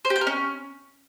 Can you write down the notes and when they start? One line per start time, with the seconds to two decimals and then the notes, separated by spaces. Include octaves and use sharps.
0.05 C5
0.10 G4
0.16 G5
0.21 A#4
0.27 C#4